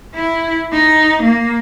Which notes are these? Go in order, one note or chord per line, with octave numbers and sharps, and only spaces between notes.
E4
D#4
A#3